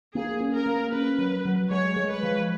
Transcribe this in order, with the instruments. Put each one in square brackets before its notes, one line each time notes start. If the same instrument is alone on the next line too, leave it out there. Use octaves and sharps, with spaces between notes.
[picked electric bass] A#3 [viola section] G#4
[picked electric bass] C#4
[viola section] A#4
[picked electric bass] A#3
[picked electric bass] C#4 [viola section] B4
[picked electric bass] F#3
F#3
[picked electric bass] G#3 [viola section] C#5
[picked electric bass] G#3
[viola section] B4
[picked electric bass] F3